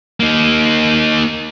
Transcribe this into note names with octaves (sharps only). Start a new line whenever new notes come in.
A#3 D#4